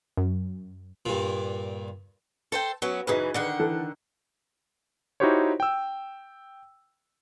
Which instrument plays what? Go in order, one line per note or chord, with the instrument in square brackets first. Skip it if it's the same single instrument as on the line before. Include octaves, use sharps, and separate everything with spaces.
[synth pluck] F#2
[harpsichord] G2 A#2
[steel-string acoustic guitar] A4 C5 G5
F#3 B3 C#4
[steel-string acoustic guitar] F#2 C#3 E3 [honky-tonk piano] D#4 G#4 B4
[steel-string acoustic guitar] D3 D#3 F#5
[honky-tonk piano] E3 A4
[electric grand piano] D#4 E4 F#4 G4 C5 C#5
G5 E6